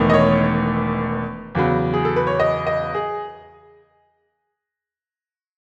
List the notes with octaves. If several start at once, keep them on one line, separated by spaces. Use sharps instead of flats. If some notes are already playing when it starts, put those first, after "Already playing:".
Already playing: E1 E2 D#3 A3
D#5
C#5
E2 C#3 F#3 B3
G#4
A4
B4
C#5
D#5
D#5
G#4